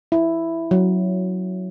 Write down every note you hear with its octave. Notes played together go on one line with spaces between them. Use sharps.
E4
F#3